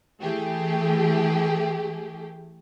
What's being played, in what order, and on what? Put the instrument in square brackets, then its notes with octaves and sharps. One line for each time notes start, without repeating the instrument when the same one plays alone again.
[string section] E3 A3 G4 G#4